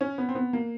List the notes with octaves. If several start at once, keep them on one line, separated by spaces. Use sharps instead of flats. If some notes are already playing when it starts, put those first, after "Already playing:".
C#4
B3
C4
B3
A#3